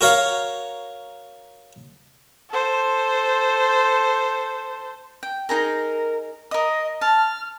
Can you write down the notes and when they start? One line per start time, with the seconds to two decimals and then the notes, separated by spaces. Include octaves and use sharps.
0.01 F#4 A#4 C#5 F5 F#5
2.50 A4 C5
5.23 G5
5.49 D#4 G#4 A#4 A#5
6.51 A#4 D#5 D#6
7.01 A5 F6